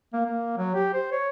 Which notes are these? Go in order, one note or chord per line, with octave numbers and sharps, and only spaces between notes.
A#3
A#3
F#3
G4
C5
C#5